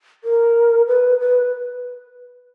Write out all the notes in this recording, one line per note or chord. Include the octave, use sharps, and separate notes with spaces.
A#4
B4
B4